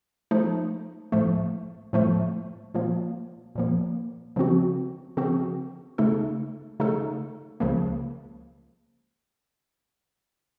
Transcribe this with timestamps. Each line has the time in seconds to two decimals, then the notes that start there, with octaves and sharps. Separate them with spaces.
0.31 F3 A3 D#4
1.12 A2 F3 A3
1.93 A2 F3 A3
2.74 A#2 F3 A#3
3.55 A#2 F3 A#3
4.36 C#3 F3 C4 F#4
5.17 C#3 F3 C4 F#4
5.98 C#3 A3 D#4 A4
6.80 C#3 A3 D#4 A4
7.60 C#2 C#3 F3 A#3